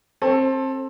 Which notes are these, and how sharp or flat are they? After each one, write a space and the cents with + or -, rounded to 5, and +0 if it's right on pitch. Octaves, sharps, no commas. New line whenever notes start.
C4 +25 A4 +0